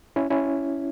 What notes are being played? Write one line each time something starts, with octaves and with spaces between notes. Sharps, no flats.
C#4 E4
C#4 E4